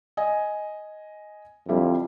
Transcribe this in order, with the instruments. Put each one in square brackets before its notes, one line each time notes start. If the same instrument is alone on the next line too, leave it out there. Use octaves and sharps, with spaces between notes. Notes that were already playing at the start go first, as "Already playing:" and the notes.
[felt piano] D#5 G#5
[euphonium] F2 [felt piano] D3 G3 E4